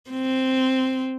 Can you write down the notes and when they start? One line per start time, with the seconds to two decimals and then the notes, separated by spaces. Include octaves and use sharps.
0.11 C4